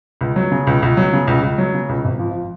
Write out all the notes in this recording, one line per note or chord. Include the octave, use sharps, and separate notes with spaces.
C#2
F#3
C#3
C#2
C#2
F#3
C#3
C#2
C#2
F#3
C#3
C#2
G#1
F3